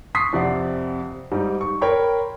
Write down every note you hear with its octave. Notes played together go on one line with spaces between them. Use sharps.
C6 C#6 D#6 B6 C7
F2 C3 D5 F#5
G#2 G3 D#4
C#6
A#4 C#5 G5 B5 C6